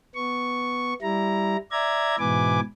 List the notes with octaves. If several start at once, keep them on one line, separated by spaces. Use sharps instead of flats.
B3 C#6
G3 E4 A#5
D5 E5 A#5 G#6
G#2 B2 E3 B4 G#5 D6